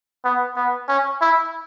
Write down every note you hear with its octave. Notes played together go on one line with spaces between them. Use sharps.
B3
B3
C#4
E4